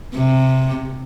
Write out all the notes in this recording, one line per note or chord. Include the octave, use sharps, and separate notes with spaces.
C3